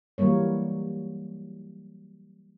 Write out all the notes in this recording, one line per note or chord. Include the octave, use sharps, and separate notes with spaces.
E3 F#3 G3 A#3 C#5